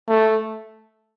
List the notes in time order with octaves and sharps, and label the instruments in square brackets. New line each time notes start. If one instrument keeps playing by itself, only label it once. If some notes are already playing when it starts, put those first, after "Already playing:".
[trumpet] A3